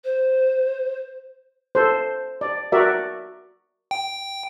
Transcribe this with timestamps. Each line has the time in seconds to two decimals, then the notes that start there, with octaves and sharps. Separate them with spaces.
0.04 C5
1.75 A4 C5
2.41 D5
2.72 F#4 A#4 D5 E5
3.91 G5